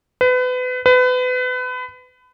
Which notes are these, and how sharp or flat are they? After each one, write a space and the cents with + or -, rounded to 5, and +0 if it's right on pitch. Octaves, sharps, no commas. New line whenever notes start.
B4 +30
B4 +30